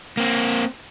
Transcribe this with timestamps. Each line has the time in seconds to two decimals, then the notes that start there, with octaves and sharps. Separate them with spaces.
0.17 A#3 C4